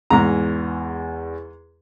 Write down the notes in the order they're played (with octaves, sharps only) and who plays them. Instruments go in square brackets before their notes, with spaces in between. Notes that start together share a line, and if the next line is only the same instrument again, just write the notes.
[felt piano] E2 [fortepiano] G#2 A#5